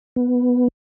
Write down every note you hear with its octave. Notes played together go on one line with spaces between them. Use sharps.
B3